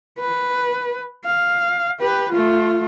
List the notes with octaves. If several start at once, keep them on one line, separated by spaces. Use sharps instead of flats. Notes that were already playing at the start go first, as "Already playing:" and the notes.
B4
F5
G4 B4
A3 F4